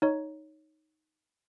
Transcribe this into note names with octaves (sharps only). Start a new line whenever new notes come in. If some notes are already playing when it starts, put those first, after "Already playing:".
D#4 C#5